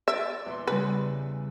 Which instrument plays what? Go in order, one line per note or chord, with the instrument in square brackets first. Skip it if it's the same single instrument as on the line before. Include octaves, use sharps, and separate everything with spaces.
[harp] D5 D6 [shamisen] E5
[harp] E2 A#2 C6
[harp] E2 C#3 G3 [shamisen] B4